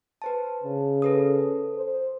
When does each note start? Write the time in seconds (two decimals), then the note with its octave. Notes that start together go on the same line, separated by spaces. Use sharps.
0.22 B4 C5 A5
0.64 C#3
1.02 A4 B4 D#6
1.76 C5